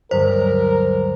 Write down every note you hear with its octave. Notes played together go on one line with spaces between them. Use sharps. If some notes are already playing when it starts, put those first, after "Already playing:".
D2 G2 F#3 A#4 C5